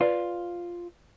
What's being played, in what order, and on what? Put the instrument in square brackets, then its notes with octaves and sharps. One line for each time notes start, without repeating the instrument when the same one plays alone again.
[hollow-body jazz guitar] F4 [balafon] B4 D5